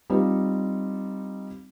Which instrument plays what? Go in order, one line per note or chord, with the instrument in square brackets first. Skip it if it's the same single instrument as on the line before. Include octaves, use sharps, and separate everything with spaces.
[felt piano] G3 C4 D#4 F4